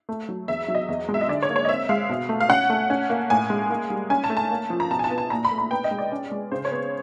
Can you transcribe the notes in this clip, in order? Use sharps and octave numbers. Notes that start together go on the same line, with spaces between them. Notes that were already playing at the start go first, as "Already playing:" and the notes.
A3
F#3
E2 E5
F#3
D#5
E2
G#3
E5
D#5
D3 D5
C#5
A#3
C#5
D#5
C4 E5
G#3 F5
B2
A3
F5
C#4 F#5
A3
C#4
A#3
A2 G#5
G#3
A#3
G3
C#4 G#5
A5
A3
A5
A#3
F3
A#5
B2 A5
G#5
A5
B3
A5
A#2 A#5
B5
A3
B5
B3 G5
D#5
G#3
D5
C#4
G#3
C#3 C5
C#5
B3